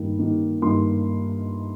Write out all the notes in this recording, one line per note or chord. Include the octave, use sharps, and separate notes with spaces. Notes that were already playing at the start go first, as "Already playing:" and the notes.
Already playing: G2 D#3 A#3
G2 D#3 A#3
G2 D#3 A#3 C6